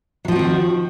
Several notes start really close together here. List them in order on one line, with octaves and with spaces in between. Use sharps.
F#3 F3 F#4 C4 D#3